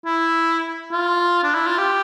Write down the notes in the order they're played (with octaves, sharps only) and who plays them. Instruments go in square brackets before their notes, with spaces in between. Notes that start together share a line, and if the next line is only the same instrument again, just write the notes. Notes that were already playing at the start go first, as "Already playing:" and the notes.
[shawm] E4
F4
D4
E4
F4
G4